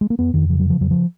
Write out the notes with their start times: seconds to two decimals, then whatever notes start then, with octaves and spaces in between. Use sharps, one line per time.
0.01 G#3
0.10 A#3
0.19 F2 B3
0.34 F2 D#3
0.49 C#3 F3
0.60 F#3
0.66 C#3 F3
0.81 F2 F#3
0.91 F3